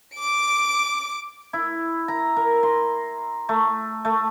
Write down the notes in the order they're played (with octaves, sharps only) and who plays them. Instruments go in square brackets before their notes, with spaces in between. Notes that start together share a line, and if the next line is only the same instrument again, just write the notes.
[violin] D6 D7
[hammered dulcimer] E4
A#5
A#4
C6
A3
A3